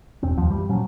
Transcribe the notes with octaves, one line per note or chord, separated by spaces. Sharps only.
E1 C4
D#2 F3
F#2 E3 G3
A#2 F3 F#3 C#4